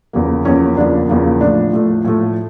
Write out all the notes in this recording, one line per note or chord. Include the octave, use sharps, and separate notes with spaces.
E2 C#3 F3 A#3
E2 C#3 F3 A#3 C#4
E2 C#3 F3 A#3 D4
E2 C#3 F3 A#3
A2 F3 A3 D4
A2 F3 A3
A2 F3 A3